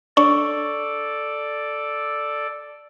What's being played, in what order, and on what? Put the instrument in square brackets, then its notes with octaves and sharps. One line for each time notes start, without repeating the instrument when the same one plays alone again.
[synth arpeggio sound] D4 C#5 [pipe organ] A4 D5 [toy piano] C#6